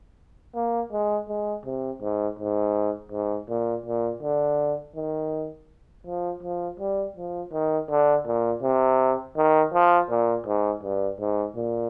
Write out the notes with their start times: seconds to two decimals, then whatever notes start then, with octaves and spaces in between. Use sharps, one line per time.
0.55 A#3
0.92 G#3
1.29 G#3
1.65 C3
2.02 G#2
2.39 G#2
3.12 G#2
3.49 A#2
3.86 A#2
4.22 D3
4.96 D#3
6.06 F3
6.43 F3
6.80 G3
7.16 F3
7.53 D#3
7.90 D3
8.26 A#2
8.63 C3
9.37 D#3
9.73 F3
10.10 A#2
10.47 G#2
10.83 G2
11.20 G#2
11.57 A#2